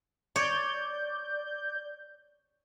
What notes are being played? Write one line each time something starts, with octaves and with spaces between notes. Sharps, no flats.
C#5 D5 G6